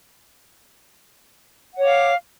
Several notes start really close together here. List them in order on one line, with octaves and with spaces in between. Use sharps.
F#5 C#5 D6 F5